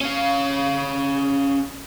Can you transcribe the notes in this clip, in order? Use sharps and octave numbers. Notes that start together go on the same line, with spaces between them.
C#4 F5